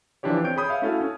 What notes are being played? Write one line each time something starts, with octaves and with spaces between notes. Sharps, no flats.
E3 F3 D4 E4 G4 C#5
C4 C#5 G5 G6 D7
G#4 C#5 B5 D#6 G6
C#5 E5 F5
A3 C#4 E4 F#4 A4 F5
C#4